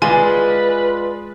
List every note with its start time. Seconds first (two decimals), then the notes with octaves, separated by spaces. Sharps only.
0.02 G#3 F4 B4 D5 D#5 G#5